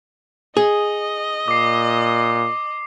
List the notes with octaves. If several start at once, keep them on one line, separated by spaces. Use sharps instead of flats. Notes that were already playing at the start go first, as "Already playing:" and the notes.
G#4 D#5 D#6
A#2 D6 C7